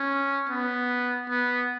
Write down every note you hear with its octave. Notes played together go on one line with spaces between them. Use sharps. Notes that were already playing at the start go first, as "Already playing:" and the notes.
Already playing: C#4
B3
B3